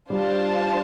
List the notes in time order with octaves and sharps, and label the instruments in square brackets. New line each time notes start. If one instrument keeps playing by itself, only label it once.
[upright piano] G3 [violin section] D4 F4 C5 F5 A5